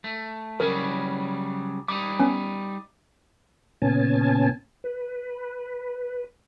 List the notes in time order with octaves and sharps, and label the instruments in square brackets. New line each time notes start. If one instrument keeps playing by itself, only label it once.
[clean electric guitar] A3
[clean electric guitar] C#3 F#3 G3 [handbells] A#4
[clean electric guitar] G3 D#4 [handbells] D6
[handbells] B3 C#4
[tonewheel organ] A#2 C#3 B3 C#4 G#5 A5
B4